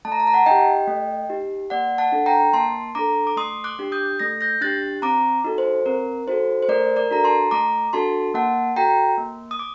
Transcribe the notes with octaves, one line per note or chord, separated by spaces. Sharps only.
A3 A5
A#5
A5
A#5
F#5 A5
D#4 G4 D#5 G5
A3
D#4 G4
A#3 D5 F#5
F#5 A5
D4 A4
G5 A#5
A#3 A5 C6
D4 A4 A#5 D6
D6
A3 C6 D#6
D6 F#6
D4 G4
D#6 G6
A3 A#6
G6 A#6
D4 G4 F#6 A6
C4 A#5 D6
D#4 F#4 A4
C5
C4 A#4
D#4 F#4 A4 C5
C5
A3 A#4 D5
A#4 D5
D4 F#4 A4 A#5
A5 C6
A3 A#5 D6
D4 F#4 A4 A5 C6
A#3 F#5 A5
F#4 A4 G5 A#5
A#3
D#6
D6